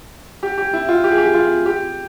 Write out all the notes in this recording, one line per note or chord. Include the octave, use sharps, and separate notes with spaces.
G4
G4
E4
F4
G4
G#4
G4
F4
G4